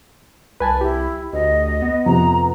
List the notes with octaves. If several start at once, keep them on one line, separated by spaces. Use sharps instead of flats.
C2 B4 G#5 A5
E4 G4
D2 D#5
B3
F2 C3 A#5